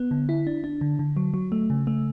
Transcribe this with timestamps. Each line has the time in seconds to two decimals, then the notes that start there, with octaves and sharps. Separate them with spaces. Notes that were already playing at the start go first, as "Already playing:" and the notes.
Already playing: B3
0.11 D3
0.29 E4
0.47 D4
0.64 D4
0.81 D3
0.99 D3
1.17 F#3
1.34 F#3
1.52 A3
1.70 C#3
1.87 A3